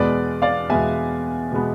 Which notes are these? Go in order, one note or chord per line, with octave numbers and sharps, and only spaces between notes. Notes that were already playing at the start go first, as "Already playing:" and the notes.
Already playing: E2 B2 G#3 B3 B4 D5
D5 F5
E2 B2 G#3 B3 E5 G#5
B2 G#3 B3